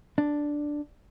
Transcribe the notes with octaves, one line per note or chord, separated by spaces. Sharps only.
D4